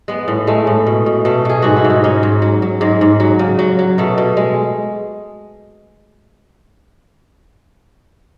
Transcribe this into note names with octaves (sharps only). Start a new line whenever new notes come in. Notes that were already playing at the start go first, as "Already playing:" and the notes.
G#3 B3
A2
G#3 A3
A2
B2
B2
B2 A3
B2 G#4
G#2 F#4
E4
G#2
D#4
G#2 C#4
G#2
F#3
F#3
G#2 G#3
G#2
F#3
C#3
F#3
F#3
B2 A3
B2
G#3